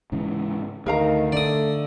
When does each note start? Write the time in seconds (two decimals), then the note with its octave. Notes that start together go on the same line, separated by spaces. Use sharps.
0.12 G#2 C#3 E3
0.86 D2 D#3 A#4 F5 A#5
1.32 D3 A3 D5 D#6